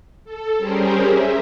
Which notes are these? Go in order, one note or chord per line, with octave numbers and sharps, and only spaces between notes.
A4
G3 C#4 G4 G#4 A#4 C5
E5